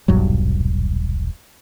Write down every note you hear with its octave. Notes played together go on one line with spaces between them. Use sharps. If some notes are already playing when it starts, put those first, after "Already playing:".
D#1 B1 G2 F#3